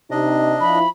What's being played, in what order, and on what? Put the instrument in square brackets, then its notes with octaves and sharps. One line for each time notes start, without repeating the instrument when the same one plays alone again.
[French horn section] C3 D#4 [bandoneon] D4 D#5
[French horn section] F3 E4 [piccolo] B5